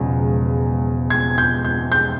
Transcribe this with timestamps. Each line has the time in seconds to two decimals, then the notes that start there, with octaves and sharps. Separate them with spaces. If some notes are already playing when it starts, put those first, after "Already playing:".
Already playing: E1 E2 C#3 F3 G#3
1.10 G#6
1.38 G6
1.65 G6
1.92 G6